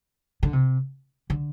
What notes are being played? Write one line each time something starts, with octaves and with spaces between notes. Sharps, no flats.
D3
C3
D3